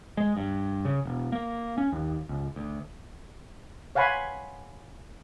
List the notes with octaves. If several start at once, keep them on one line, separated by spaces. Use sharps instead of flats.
G#3
G2
C#3
E1
A#3
C#4
D#2
C#2
D2
C#5 F5 F#5 G#5 B5 C6